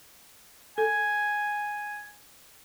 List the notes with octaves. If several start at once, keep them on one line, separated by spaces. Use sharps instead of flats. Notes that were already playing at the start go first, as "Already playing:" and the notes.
A4 G#5